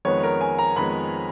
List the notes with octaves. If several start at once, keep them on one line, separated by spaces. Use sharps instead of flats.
F2 D#3 G#3 B3 C#5
A#4
G#5
A#5
F2 D#3 G#3 B3 B5